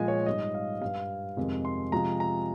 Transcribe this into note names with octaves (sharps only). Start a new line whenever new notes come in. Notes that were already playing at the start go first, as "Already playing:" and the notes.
Already playing: A#2 F3 G#3 G#5
C#5
G#2 G3 D#5
F5
G2 G3 F5
F2 C3 D#3 G#3
C6
C3 F3 G#3 A#5
A#5